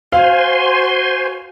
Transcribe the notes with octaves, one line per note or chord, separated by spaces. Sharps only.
F#4 C5 F5 G#5 C6